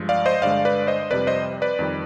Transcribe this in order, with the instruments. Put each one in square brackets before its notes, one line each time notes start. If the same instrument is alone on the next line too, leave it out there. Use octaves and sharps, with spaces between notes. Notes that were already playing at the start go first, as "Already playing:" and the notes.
Already playing: [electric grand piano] G2 F3 G#3
D5 F5
C5 D#5
G2 D3 G#3 D5 F5
B4 D5
C5 D#5
F2 C3 G3 B4 D5
C5 D#5
B4 D5
F2 D#3 G3